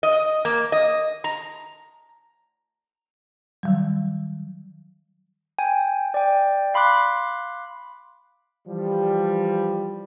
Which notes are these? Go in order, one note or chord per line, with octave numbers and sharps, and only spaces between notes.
D#5
A#3
D#5
A#5
D#3 F#3 G3
G5 G#5
D5 G5
F5 B5 C6 D6 F#6
E3 F3 G3